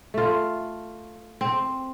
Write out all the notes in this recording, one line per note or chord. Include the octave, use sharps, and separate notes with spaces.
A3 F4
C4